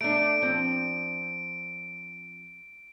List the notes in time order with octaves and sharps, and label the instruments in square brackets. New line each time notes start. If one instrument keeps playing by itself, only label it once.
[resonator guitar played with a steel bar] A3 D4 [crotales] D7
[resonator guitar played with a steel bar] F3 C4